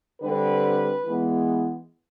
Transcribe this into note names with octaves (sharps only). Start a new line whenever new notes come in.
D3 G3 C4 B4
E3 G#3 B3